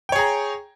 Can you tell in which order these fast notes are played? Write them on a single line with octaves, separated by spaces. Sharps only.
G5 C#5 G#4 A#5